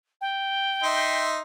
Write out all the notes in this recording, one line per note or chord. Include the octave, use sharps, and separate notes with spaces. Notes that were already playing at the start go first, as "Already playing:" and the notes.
G5
D#4 E5 C6